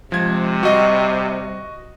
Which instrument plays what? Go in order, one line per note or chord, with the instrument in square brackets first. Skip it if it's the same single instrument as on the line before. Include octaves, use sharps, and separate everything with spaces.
[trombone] C3 [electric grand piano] F3 G#6 [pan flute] G#3
[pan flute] G3 [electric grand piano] F#4 D#5